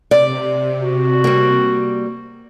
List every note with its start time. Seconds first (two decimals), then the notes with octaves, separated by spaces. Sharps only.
0.11 C3 D5
0.81 F#4
1.24 G3 A#3